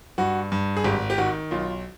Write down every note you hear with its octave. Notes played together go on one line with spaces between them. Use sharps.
G2 F#4
G2
G#4
G#1 G4
G4
D#3 F#4
B1 F4